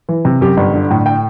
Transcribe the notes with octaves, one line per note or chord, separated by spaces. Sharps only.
E3
C3
F#2 G4
G1
D3
A2
G5